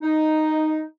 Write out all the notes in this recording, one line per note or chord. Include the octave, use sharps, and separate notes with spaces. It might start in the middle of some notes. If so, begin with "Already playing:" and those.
D#4